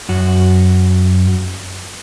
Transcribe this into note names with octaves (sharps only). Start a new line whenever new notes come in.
F#2 F#4